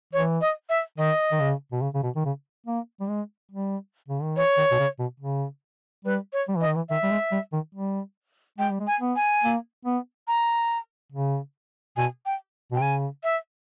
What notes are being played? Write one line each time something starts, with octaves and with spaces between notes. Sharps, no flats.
E3 C#5
D#5
E5
D#3 D#5
D#3
C#3
B2
C#3
C#3
B2
D#3
C#3
A#3
G3
G#3
G3
C#3
D#3
E3 C#5
D#3
B2
C#3
B2
C#3
G3 B4
C#5
G3
E3
D#5
D#3
E3
D#3 E5
G3
G#3
G3
D#3
G3
G#3 G5
G3
G#3
G#5
B3
G#5
A#3
B3
A#5
C#3
B2 G#5
G5
B2 G5
C#3 G#5
E5